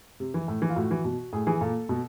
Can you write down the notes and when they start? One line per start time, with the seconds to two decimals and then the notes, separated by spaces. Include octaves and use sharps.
0.20 C3
0.34 E3
0.48 A2
0.62 E3
0.69 F4
0.76 A2 F#4
0.91 E3
1.05 B2
1.33 A2 G#4
1.47 E3 G#4
1.61 A#2 A4
1.89 B2